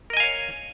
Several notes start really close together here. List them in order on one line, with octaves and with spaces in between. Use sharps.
A#4 D#5 G#5 F5 C#5